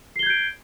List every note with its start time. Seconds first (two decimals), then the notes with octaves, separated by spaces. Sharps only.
0.16 C7
0.19 G7
0.23 G#6
0.26 G6
0.30 D7